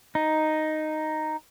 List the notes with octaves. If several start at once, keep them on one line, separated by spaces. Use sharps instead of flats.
D#4